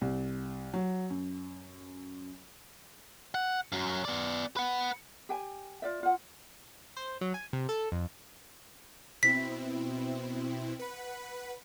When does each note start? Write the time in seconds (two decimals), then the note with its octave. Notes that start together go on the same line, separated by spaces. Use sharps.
0.01 C2
0.74 F#3
1.10 F#2
3.34 F#5
3.72 F#2 F#3
4.05 B3 D5
4.57 B4 F#5
5.29 G4 G5 G#5
5.82 F4 D5 E5
6.03 F4 F#5
6.97 C5
7.21 F#3
7.34 G#5
7.53 C3
7.69 A4
7.92 F2
9.23 B2 C4 E4 B6
10.79 B4 F#5 B5